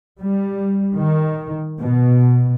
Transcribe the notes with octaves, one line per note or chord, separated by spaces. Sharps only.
G3
D#3
B2